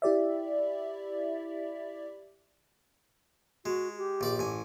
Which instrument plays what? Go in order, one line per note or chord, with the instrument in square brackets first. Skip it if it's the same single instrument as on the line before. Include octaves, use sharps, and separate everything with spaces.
[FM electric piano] E4 G4 D5 E5
[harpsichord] G#3 [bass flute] F#4
[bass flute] G4
[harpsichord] A#1 D5 D6
A1 G#5